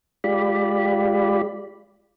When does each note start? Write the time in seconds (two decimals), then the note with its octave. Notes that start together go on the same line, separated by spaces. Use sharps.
0.24 G#3 F4 G4 D5 B5